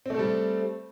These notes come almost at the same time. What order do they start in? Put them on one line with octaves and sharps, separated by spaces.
C4 A3 A4 G3